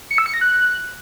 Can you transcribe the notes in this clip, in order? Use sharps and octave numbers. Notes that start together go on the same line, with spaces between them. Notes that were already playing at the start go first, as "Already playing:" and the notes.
C#7
E6
C#7
A#6
F#6